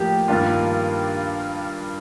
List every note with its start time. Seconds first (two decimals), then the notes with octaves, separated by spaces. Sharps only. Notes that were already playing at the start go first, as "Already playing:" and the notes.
Already playing: A2 F3 A#3 G4
0.28 G2 D#3 A#3 D4 F4